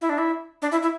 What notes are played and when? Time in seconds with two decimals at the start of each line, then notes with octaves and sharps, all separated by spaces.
0.01 E4
0.09 D4
0.18 E4
0.62 D4
0.72 E4
0.83 E4